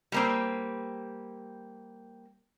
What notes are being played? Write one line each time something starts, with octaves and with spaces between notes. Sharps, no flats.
G3 A#3 C4